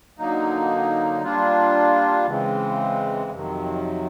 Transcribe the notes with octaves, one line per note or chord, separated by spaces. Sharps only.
D3 F#3 A#3 D#4
G3 A#3 D4 F4
C#3 E3 G#3 C4
F2 C3 D#3 F#3